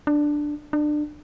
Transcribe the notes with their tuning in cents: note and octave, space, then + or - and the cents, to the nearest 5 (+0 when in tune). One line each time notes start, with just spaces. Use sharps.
D4 +5
D4 +25